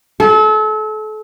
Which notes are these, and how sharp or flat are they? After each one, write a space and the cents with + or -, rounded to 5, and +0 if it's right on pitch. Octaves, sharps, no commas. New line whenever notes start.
A4 -35